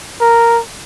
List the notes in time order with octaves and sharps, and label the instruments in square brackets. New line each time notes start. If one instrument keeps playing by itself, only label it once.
[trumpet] A#4